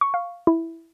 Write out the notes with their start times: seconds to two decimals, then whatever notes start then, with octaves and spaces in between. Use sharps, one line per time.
0.01 C#6
0.14 F5
0.47 E4